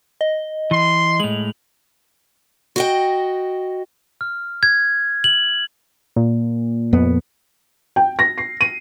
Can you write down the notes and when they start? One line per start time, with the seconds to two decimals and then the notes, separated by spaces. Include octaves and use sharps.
0.21 D#5
0.71 E3 C6
1.20 A2 G#3 F7 F#7
2.76 F#4 D#5 G5
4.21 F6
4.63 G#6
5.24 F#7
6.16 A#2
6.93 F2 B3
7.96 G5
8.19 A#6
8.38 C7
8.61 D#7